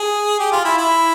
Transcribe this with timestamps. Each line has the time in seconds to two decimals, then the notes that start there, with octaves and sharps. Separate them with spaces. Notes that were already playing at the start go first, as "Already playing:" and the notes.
Already playing: G#4
0.39 G4
0.52 F4
0.65 E4
0.78 E4